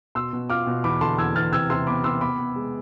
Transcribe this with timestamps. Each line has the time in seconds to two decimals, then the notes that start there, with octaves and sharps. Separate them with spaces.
0.15 B2 C6 E6
0.33 B2
0.50 F4 D6 F6
0.67 B2
0.84 E2 B5 D6
1.01 D3 A5 C6
1.18 E2 E6 G#6
1.36 E2 F6 A6
1.52 C3 E6 G#6
1.70 C3 C6 E6
1.87 B3 B5 D6
2.04 C3 C6 E6
2.21 B3 B5 D6
2.38 B3
2.56 G#3